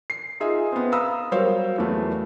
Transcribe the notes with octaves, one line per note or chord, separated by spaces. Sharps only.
C7
D#4 F4 G#4 E5
B3 C4
F5 A#5 B5 D#6 E6
F#3 G3 A#4 C5 C#5 F5
E2 F#3 A3